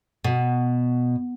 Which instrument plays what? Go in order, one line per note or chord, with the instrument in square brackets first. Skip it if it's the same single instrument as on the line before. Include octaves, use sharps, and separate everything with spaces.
[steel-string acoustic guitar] B2